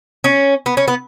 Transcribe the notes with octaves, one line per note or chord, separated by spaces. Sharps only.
C#4
B3
C#4
B3